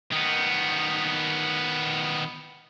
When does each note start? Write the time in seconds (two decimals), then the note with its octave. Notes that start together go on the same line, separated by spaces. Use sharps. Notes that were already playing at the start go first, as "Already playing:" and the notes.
0.13 D#3 B3